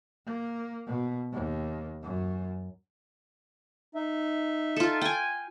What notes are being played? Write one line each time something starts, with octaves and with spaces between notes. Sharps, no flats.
A#3
B2
D#2
F#2
D#4 E5
F4 A4
G5 G#5